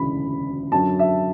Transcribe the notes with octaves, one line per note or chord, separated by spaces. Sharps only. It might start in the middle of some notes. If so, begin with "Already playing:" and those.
Already playing: E1 D2 C#3 E3 B5
F#2 D3 F#3 A5
E5